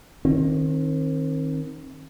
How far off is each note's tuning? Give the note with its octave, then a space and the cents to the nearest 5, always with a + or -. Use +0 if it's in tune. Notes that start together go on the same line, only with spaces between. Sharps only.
D#3 +0 C4 +35